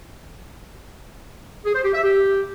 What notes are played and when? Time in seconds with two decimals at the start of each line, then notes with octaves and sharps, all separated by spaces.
1.65 G#4
1.75 C5
1.84 G4
1.94 E5
2.03 G4